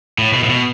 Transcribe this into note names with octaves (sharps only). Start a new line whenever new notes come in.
A2
B2
A2
B2